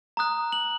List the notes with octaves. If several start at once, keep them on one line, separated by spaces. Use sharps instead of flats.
A#5 D#6 F#6
F#7